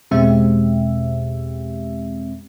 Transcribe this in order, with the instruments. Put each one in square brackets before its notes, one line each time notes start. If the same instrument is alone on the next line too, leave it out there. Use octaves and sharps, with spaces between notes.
[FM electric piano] E2 B2 G#3 C4 G4 E5